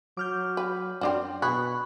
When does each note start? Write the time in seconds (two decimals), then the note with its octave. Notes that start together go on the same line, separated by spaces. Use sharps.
0.17 F#3 D6 F6 G6
0.57 B4
1.01 F#2 C4 D4 F#4
1.42 B2 G#4 B5 C#6 F#6